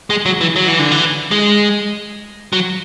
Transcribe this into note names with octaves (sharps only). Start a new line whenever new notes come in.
G#3
F#3
E3
F#3
E3
D3
E3
G#3
F#3